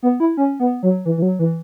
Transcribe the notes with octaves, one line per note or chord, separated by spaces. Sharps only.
B3
E4
C#4
B3
F#3
E3
E3
F#3
E3